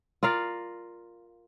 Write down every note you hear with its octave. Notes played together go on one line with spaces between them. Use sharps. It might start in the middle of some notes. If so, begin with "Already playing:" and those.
F4 A#4 D5 F5